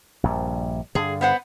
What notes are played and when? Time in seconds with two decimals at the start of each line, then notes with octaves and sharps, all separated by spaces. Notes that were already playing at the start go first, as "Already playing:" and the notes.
0.23 A#1 G2
0.95 G2 D3 G#4
1.21 B3 C5 F#5